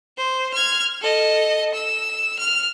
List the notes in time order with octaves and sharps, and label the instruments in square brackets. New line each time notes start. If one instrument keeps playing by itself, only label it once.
[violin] C5
F6 G#6
A4 D#5
E6
F6